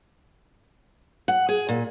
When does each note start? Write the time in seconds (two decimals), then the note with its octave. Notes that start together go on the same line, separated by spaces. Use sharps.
1.28 F#5
1.49 G#4
1.69 A#2